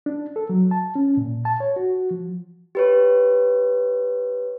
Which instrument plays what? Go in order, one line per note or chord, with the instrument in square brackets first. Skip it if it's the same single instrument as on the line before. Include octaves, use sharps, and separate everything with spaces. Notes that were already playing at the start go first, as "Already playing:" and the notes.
[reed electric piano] D4
A4
F#3
A5
C#4
A#2
A5
C#5
F#4
F3
[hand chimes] G4 B4 C#5